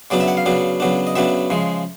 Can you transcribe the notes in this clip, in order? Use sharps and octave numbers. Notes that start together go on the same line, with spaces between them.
C#3 F#3 B3 D4 D5
E5
F#5
F5
C#3 F#3 B3 D4
C#3 F#3 B3 D4
D#5
C#3 F#3 B3 D4 E5
C#3 F3 G#3